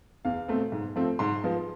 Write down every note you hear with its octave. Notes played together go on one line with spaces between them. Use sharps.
E2 F5
B2 A3 C4
G#2
F3 A3 C4
G#2 C6
F3 G#3 B3